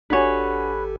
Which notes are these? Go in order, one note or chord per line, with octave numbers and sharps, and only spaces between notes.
G#1 D4 F#4 G4 A4 B4 C#5 G#5